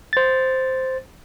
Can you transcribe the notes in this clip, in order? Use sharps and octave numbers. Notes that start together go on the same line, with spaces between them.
C5 A6